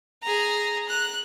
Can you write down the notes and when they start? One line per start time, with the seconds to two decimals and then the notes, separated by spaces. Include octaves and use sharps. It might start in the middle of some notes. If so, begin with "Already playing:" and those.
0.23 G#4 A#5
0.89 F#6